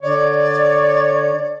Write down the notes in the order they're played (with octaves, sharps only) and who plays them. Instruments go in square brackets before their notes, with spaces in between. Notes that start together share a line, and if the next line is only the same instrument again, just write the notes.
[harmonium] D3 [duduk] C#5 [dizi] D5